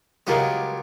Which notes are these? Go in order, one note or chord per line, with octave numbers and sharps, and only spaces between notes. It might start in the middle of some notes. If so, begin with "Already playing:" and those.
C#2 F#3 G3 B3 F4 A#4